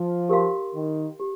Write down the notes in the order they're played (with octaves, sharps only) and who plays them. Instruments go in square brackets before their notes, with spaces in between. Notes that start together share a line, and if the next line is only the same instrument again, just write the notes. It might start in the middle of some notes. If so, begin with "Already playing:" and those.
Already playing: [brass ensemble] F3
[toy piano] G4 A#4 F5 C6
[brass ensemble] D#3
[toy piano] G4